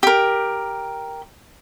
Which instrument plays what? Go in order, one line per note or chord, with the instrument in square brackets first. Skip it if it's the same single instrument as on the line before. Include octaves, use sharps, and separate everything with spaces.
[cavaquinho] G4 A#4